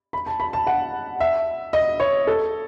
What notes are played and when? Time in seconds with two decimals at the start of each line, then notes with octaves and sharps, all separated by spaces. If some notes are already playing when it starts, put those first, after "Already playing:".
0.13 B5
0.26 A5
0.40 B5
0.53 A5
0.67 F#5
1.20 E5
1.73 D#5
2.00 C#5
2.27 A4